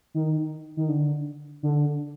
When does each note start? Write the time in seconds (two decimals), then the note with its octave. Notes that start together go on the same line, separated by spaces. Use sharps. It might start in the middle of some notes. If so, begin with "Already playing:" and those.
0.14 D#3
0.77 D#3
0.89 D3
1.63 D3